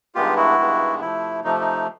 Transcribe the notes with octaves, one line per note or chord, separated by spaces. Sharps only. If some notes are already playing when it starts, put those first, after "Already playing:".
G2 D#3 G#3 B3 F4 G4
E4 F#4
G2 D#3 G#3 B3
C3 F3 A3 E4
C3 F3 A3 D#4
D#4